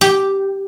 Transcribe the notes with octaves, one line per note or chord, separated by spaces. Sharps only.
G4